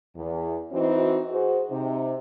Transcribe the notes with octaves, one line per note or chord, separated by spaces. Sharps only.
E2
E3 C4 D#4 E4 F#4
F#4 G#4 C5
C3 D#4